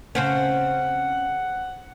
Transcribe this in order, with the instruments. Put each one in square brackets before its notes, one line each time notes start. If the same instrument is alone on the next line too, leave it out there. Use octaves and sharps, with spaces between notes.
[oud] C#3 C4 C#4 [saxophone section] F#5